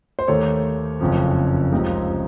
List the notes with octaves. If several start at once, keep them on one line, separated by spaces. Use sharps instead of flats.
C5
D#2 D#3 A3 C#5
F#1 F2 C#3 F3
C#2 C3 F3 C4 D#4